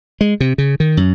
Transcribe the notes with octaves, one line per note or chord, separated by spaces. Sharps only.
G#3
C3
C#3
D#3
F#2